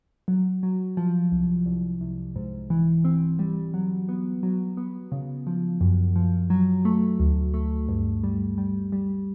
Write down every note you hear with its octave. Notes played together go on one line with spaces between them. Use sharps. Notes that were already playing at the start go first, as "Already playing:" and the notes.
F#3
F#3
F3
C2
C2
C2
G#2
E3
C4
G3
F#3
B3
F#3
B3
C#3
F3
F#2
F3
F#3
A3
D2
A3
G2
G3
G3
G3